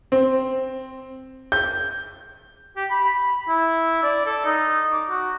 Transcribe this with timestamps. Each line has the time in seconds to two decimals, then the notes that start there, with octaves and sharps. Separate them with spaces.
0.12 C4
1.52 G6
2.77 G4
2.90 B5
3.04 B5
3.48 E4
4.03 D5
4.26 A4
4.46 D#4
4.92 D6
5.10 F#4